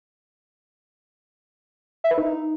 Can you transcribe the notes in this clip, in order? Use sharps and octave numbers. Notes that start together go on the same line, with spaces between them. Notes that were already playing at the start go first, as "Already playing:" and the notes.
E5
B4
D#4